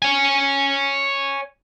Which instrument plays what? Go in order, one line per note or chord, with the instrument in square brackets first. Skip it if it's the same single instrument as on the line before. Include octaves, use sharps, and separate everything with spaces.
[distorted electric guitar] C#5 G#5